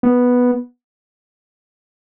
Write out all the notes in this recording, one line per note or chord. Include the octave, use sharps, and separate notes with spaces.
B3